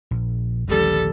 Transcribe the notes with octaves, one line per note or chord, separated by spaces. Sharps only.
A#1
D#1 A#1 D3 G3 A4